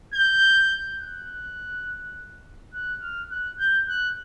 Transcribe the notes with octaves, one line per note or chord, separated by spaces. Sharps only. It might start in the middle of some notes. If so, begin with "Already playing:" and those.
G6
F#6
F#6
F6
F#6
G6
F#6